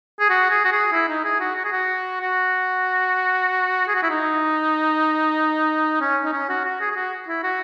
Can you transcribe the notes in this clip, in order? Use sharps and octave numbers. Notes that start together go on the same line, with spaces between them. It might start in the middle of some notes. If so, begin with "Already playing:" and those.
G#4
F#4
G#4
F#4
G#4
E4
D#4
G#4
F#4
F#4
G#4
F#4
F#4
G#4
F#4
E4
D#4
C#4
D#4
C#4
F#4
F#4
G#4
G#4
F#4
E4
F#4